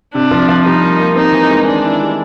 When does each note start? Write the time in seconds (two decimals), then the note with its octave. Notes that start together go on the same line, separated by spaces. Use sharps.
0.14 C3 D4
0.31 F3
0.48 F3
0.65 G3 D#4
0.83 A#3
0.99 A#3
1.16 C4 D#4
1.33 E3
1.50 G#3
1.67 D#3 D4
1.85 E4
2.01 G3